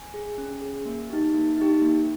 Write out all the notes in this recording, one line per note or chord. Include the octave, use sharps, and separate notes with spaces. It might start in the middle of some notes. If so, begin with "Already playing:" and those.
Already playing: G#5
G#4
C#4
G#4
A#3
D#4 G4
A#3
D#4 G4
A#3